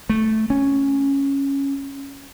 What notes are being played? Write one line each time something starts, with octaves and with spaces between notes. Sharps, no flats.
A3
C#4